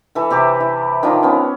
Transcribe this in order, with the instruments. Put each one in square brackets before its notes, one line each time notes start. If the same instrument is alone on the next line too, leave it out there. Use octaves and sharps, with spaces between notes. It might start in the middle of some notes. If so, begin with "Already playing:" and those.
[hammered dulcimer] E3 A4
C3 G4 D6
E4
D#3 F3 D4
B3 C#4